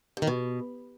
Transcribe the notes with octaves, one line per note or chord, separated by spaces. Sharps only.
G2
D#3
B2